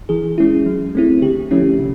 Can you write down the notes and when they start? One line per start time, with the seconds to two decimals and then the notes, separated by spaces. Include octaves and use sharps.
0.09 E3 G#4
0.38 G#3 C#4 E4
0.66 F#3
0.95 A3 C4 E4
1.22 D3 G4
1.51 F3 A3 C#4 E4
1.79 C3